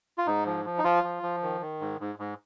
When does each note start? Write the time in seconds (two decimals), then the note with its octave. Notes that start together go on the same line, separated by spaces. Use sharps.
0.18 F4
0.27 G#2 D#4
0.46 F3
0.65 F3
0.78 D#4
0.84 F3 F4
1.04 F3
1.23 F3
1.42 D#3
1.61 D#3
1.81 G#2
2.00 G#2
2.19 G#2